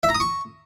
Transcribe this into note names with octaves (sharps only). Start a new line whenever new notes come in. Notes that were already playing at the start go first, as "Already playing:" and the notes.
E5
A#5
D#6
C#6